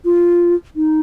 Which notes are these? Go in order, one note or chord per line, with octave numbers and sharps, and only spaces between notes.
F4
D#4